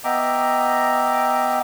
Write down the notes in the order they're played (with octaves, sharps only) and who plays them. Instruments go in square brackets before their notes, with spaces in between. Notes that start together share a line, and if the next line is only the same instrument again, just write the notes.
[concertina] B3 D#5 E5 G5 A#5 D6